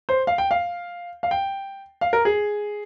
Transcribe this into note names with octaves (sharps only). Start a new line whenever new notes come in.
C5
F5
G5
F5
F5
G5
F5
A#4
G#4